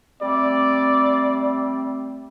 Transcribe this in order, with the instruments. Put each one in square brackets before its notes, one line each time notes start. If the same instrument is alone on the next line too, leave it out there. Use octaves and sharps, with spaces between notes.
[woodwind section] G3 A3 C4 [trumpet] D5